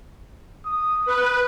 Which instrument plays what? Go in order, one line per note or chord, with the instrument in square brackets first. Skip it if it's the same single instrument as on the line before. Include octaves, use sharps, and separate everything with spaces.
[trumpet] D#6
[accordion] B4